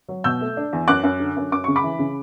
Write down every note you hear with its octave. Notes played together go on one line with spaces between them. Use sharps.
F#3
B2 E6 G6
A3
D4
E2
F#2 D6 F#6
F#2
D3
F#2
F#2 D6
C#3 C#6
B5 D6
E3
C#3